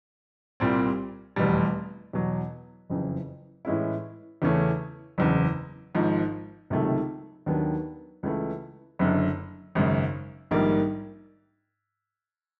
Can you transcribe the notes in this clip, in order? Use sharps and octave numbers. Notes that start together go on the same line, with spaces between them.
C2 A#2 G3 C4
F1 E2 B2 G3
E2 B2 F#3
F#1 F2 C#3 E3
A2 E3 G#3 C#4 E4
E2 C#3 E3 A3 C#4
F#1 E2 C#3
G#1 G#2 F3
C#2 C3 D#3 F#3 A3
D#2 D#3 F#3 B3 D4
C#2 C#3 E3 A3
F#1 F#2 D3
G#1 F#2 C#3
A#1 G#2 D#3 G3 A#3